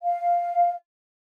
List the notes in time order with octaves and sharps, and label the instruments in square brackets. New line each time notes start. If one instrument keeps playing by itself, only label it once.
[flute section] F5